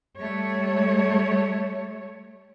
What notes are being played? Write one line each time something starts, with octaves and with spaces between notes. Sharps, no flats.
G3 A3 C#5